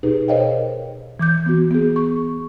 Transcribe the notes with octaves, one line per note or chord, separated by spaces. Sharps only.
B2 D#4 G4 G#4 B4
A#4 C5 C#5 D#5 F5 G5
E3 D6 G6
B3 F#4
B3 G#4
C#6